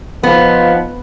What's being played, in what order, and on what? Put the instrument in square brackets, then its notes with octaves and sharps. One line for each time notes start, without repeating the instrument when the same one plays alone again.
[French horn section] F3 D#4 [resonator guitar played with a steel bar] B3